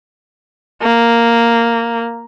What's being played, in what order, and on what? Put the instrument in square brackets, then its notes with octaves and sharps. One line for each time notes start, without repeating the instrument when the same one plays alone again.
[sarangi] A#3